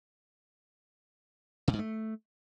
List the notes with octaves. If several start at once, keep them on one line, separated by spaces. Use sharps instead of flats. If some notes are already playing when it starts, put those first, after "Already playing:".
C3
G#2
A3